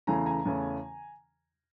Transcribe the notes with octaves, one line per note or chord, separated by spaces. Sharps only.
E2 C#3 E3 A3 C#4 G#5 A#5
G#5 A#5
E2 C#3 E3 A3 C#4